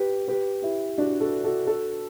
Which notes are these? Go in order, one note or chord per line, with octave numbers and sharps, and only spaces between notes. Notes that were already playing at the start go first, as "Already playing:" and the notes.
Already playing: G4 B4
G4 B4
E4 G4
D4 F#4
F#4 A4
F#4 A4
F#4 A4